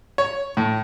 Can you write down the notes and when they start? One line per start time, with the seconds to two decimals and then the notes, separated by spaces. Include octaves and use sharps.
0.18 C#5
0.57 A2